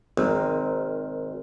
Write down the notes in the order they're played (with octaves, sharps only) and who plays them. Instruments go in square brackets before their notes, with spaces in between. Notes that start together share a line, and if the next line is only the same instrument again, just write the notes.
[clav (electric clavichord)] G#1 [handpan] G#3 C4 A#4